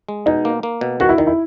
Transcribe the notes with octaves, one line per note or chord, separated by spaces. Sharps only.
G#3
B2 D#4
A#3
A#3
B2
D#3 F#4
E4
D#3 D#4
E4